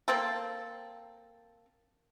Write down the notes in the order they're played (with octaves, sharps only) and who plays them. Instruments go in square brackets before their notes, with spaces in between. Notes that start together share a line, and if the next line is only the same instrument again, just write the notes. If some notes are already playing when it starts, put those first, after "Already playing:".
[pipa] A#3 C4 A4